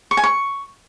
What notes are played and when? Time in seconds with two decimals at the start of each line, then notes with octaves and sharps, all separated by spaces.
0.11 C#6
0.17 G#5
0.23 C#6